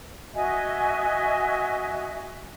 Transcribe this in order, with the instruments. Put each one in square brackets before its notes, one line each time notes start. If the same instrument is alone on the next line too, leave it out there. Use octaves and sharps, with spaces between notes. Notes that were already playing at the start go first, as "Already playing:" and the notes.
[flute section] F#4 D#5 E5 G#5